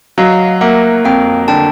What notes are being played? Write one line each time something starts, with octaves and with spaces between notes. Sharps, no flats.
F#3 D#5 F5
A#3 E5 F#5
F2 F5 G5
D3 G5 A5